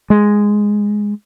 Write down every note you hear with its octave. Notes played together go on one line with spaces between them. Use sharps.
G#3